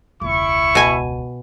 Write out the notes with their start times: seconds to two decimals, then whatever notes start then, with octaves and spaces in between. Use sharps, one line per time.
0.21 E1 C#2 E4 C#6
0.75 B2 G#5